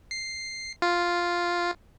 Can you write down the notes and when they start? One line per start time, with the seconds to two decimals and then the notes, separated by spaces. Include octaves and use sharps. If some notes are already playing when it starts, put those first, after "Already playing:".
0.11 C7
0.82 F4